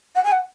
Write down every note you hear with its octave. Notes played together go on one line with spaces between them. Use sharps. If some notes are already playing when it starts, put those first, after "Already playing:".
F#5
G#5
F#5